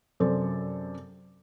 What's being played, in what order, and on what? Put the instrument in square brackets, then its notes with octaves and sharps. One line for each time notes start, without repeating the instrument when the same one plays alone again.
[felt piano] F#2 C3 A4 C5 D5